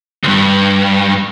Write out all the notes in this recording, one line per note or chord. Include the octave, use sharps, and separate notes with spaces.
D2 G2